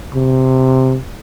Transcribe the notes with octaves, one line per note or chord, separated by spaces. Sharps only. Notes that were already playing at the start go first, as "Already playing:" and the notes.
C3